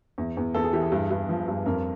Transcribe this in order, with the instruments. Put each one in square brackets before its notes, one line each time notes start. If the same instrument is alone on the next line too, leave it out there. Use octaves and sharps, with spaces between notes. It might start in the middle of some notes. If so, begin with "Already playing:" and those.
[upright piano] E2
E2
E2 A4
G#4
E3 G4
G#4
G2
G2
F3
G2
F2 A#4